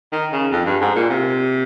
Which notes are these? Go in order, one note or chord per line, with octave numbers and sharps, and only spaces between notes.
D#3
C#3
F2
G2
G#2
A#2
C3